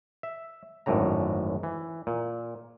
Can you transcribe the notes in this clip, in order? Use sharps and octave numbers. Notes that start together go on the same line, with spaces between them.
E5
G#1 F#2 A2 D3 A#5
E3
A#2